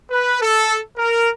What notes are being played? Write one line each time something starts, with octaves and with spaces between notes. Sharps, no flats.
B4
A4
A#4